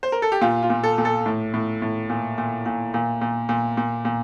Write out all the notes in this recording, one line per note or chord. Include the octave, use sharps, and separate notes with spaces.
C5
A#4
A4
G4
A#2 F4
F4
A#2
A4
A#2
A4
A2
A2
A2
A#2
A#2
A#2
A#2
A#2
A#2
A#2
A#2